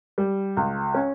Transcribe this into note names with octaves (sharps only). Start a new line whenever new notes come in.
G3
C#2
C#4